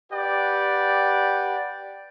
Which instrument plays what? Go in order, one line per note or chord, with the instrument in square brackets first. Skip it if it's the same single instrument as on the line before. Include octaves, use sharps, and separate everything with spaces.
[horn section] G4 B4 D5 F#5 G5